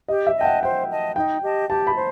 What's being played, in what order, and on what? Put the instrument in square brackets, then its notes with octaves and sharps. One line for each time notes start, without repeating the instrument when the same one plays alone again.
[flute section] G4 [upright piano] D#5
[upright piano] E5
[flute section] D#5 A5 [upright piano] G5
[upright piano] F#5
[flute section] C5 [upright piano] G5
[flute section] D#5 A5
[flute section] D#4 [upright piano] G5
[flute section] G4 D#5 A5
[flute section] G4 [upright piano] A5
[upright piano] B5
[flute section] C5